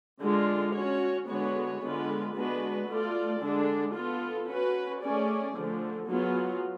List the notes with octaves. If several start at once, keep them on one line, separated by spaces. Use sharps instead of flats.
D3 G#3 D4 F4
C#4 F#4 C#5
D3 G#3 B3 F#4 C#5
D3 G#3 B3 F4 B4
G#3 B3 D4 F#4 B4
A3 F4 A4 D5
D3 G#3 D4
B3 F4 A4
C#4 F#4 B4
A3 C#4 G#4 D5
D3 F3 A3
F#3 B3 F4 G#4